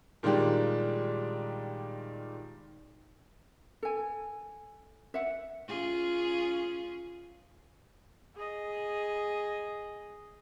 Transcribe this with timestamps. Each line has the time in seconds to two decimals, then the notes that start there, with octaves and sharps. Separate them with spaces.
0.23 A#2 D#3 G3 G#3 D4 G4
3.83 A4 G#5
5.14 E5 F#5
5.68 C#4 F4 G#4
8.35 G#4 D#5